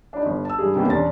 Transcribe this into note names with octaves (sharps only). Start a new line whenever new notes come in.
D4 D#4
G1
A5 E6
G2 G3 G#4
C3 D#3 A#3 B3 C#4
E1 C#4 D4 A#5 C6 A6